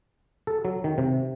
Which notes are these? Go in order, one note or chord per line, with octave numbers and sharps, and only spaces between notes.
A4
F#3
D#3
C3